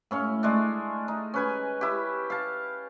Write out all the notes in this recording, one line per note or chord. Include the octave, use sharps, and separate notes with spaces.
A2 C#4 F5
G#3 A3 D4
D#4
C#4 B4 G#5
E4 G4
F5 A5